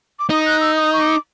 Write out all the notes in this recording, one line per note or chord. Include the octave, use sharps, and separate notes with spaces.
D6
D#4 D#6
F#6
E6
D#6
C#6
D6